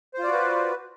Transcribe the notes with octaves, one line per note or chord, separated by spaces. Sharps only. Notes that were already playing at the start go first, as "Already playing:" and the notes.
F4 F#4 B4 C5 D5